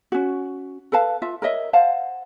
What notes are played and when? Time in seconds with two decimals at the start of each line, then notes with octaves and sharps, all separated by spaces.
0.12 C#4 F#4
0.92 A4 B4 F5 A5
1.22 F4 E5
1.42 A#4 C#5 D#5 E5
1.73 C5 F5 F#5 A5